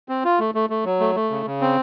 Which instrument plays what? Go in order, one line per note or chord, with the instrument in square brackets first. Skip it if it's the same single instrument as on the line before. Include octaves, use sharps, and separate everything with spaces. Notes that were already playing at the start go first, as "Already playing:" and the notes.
[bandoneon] C4
F4
A3
A3
A3
F#3
A3
A3
C#3
C#3
C4